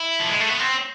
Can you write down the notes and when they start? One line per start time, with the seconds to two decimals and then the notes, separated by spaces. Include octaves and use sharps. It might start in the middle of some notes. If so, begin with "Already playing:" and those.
Already playing: E4
0.20 F3
0.29 G#3
0.40 A3
0.49 B3
0.59 C4